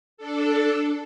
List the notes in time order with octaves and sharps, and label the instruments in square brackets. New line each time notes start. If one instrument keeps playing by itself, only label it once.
[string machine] D4 A4